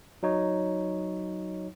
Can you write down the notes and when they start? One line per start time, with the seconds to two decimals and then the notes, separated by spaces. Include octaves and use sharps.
0.23 F#3 D#4 C#5